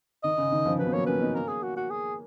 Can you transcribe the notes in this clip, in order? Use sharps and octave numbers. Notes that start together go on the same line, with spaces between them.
D#3 D#5
C#3
D#3
C#3 F3
D#3 F#3 B4
B3
F#3 A#3 C#5
A#3 C#4 B4
B3 D#4
A#3 C#4 A#4
G#4
F#4
F#4
G#4